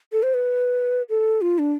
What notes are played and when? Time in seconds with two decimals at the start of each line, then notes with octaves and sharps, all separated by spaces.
0.12 A4
0.23 C5
0.34 B4
1.09 A4
1.41 F4
1.59 D4